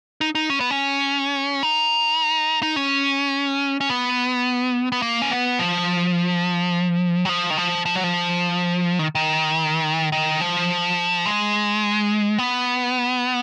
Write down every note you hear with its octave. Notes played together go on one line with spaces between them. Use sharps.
D#4
D#4
C#4
B3
C#4
D#4
D#4
C#4
C#4
B3
B3
A#3
C#4
B3
F3
F#3
F3
D#3
F3
F3
F#3
F3
D#3
D#3
D#3
F3
G#3
B3